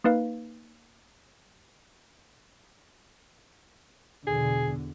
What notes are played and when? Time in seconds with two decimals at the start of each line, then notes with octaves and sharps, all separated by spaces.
0.04 A#3 D#4 B4 F5
4.27 E2 B2 D3 G#4